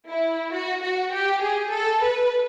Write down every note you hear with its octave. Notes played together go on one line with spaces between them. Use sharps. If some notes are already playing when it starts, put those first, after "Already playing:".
E4
F#4
F#4
G4
G#4
A4
B4